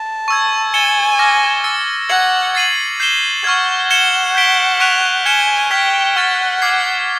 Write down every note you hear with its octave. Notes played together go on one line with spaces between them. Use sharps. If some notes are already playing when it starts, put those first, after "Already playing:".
Already playing: A5
C#6 E6 G#6
G#5 A6 C#7 E7 G7
D6 F6 A#6
E6 A6 C#7
F#5 G#6 C#7 F#7
A6 C7 D#7 F#7
G6 C7 E7 G7
F#5 C#6 F6 G#6
G#6 C#7 E7 G7
G6 B6 D7 G7
C#6 F#6 B6 D7 F7
G#5 F6 G#6 C#7 E7 G7
G5 F6 G#6 B6
F#5 C#6 F6 A6
D6 F6 G#6 C7